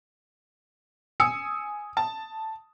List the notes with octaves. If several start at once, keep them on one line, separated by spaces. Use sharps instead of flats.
G#5 D#6 E6 C#7
A5